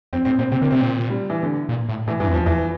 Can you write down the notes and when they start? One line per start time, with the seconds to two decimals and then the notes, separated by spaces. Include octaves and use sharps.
0.13 F2 C4
0.25 A2 C4
0.39 A#2 C4
0.52 C3 C4
0.61 D3 A#3
0.71 C3 C4
0.81 A#2 C4
1.10 G3
1.30 E3
1.43 D3
1.69 A#2
1.89 A2
2.07 A2 E3
2.20 G2 E3
2.28 F2
2.34 E2 F3
2.46 E2 E3